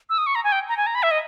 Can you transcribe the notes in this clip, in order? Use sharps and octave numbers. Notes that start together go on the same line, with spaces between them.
E6
D#6
C#6
A#5
G#5
G5
A#5
G#5
A#5
B5
E5
D#5